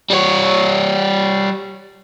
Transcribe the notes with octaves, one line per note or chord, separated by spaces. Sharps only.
G3 C#5